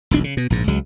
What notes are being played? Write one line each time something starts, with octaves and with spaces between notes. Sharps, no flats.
E1 B1 D4
C#3
B2
A#1 G#2
C#2 F#3 G#3